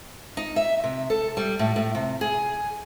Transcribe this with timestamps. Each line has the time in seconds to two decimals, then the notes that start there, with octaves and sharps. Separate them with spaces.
0.37 D#4
0.56 E5
0.84 C3
1.10 A4
1.37 G3
1.59 A2
1.76 A2
1.95 C3
2.21 G#4